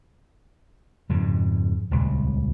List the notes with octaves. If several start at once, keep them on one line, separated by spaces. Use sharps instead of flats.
F2 G#2 C#3
D#1 C#2